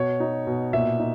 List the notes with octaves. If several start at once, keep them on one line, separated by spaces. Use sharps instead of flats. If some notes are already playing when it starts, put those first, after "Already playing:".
Already playing: B2 C#5
D#4
B2
A#2 E5
D#4